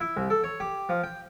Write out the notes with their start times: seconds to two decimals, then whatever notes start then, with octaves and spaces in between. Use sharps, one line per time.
0.01 E4
0.17 C2
0.30 A4
0.44 C#5
0.60 G4
0.89 F3
1.03 G5